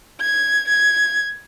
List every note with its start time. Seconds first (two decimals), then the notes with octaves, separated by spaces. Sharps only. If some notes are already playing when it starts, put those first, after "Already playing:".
0.21 G#6
0.68 G#6